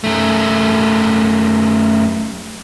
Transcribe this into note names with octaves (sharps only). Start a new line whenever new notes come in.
F#2 A3